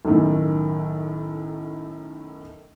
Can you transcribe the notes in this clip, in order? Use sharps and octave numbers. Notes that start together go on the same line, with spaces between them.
B1 F#2 A2 D#3